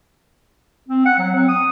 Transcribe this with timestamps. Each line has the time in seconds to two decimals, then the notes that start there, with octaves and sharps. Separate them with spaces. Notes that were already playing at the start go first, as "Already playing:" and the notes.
0.88 C4
1.05 F#5
1.18 F#3
1.35 C4
1.48 D#6